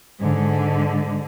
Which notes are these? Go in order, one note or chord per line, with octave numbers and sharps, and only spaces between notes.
G#2 D3